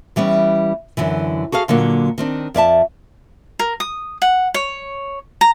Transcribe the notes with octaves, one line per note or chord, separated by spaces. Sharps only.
E3 G3 B3 C#4
F#2 D3 E3
F#4 G#4 A4 F5
A#2 D3 F#3 A#3
D#3 C4 D4
F2 D5 E5 A5
A#4
D#6
F#5
C#5
A#5